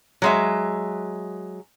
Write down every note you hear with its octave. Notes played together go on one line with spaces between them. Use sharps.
F#3 G#3 E5